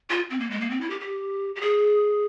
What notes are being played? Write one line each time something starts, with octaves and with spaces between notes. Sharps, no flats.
F4
C4
A#3
G#3
A#3
C4
E4
G4
G4
G4
G#4